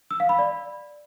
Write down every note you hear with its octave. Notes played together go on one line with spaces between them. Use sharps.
E6
F5
B5
D5